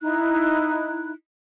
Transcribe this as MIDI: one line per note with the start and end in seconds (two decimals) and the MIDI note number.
0.01 1.12 63
0.01 1.12 64
0.01 1.12 90